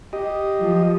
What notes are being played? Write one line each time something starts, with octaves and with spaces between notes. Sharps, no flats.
G4 D#5
F3